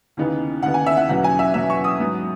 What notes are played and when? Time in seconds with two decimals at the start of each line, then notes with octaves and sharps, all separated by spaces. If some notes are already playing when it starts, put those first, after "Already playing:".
0.17 D#2 C#3 E3 B3 D#4
0.63 D#2 C#3 E3 B3 D#4 F#5
0.74 G#5
0.86 E5
0.97 F#5
1.09 E2 B2 F#3 C#4 F#5
1.24 G#5
1.39 E5
1.54 E2 B2 F#3 C#4 E5
1.70 C#6
1.84 D#6
1.99 G#2 F#3 B3